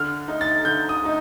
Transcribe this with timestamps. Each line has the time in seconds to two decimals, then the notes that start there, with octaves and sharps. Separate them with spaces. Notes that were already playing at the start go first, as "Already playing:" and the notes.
Already playing: D3 F6
0.28 A3 D#4
0.41 A6
0.64 D3 G6
0.89 D#6
1.02 A3 D#4